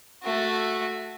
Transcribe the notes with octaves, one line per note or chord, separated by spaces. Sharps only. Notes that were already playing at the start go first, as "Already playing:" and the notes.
A3 F#4